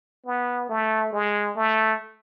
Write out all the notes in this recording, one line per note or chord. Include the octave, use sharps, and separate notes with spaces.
B3
A3
G#3
A3